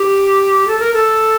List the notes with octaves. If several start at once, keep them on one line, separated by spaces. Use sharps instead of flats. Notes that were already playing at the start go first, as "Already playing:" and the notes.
Already playing: G4
A4
A#4
A4